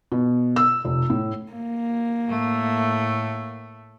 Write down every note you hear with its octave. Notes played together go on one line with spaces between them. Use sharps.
B2
E6
F1
A2
A#3
A2 A3